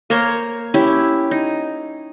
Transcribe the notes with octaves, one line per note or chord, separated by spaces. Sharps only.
A#3 A#4 C5 C#5
C#4 E4 G4
D#4